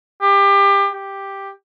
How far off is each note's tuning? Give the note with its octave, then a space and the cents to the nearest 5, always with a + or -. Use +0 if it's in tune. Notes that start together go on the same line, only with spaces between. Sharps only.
G4 +25
G4 +5